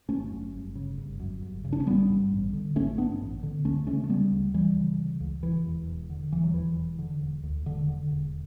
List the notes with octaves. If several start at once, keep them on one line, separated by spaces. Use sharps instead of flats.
G1 A3 C#4
F#2
G1
C#3
G1
F#2
G1
C#3
D4
C#4
A1 G3 B3
G2
A1
D3
A1 A3 C#4
G2 B3 D4
A1
D3
C#2 A3 C#4
C#3 A3 C#4
A3
C#3 G3 B3
C#2
C#2 E3 G3
C#3
C#3
C#2
E1 E3
E2
E1
D3
E1 E3
F#3
E2 E3
E1
D3
E1
D2
E1 D3
D3
E1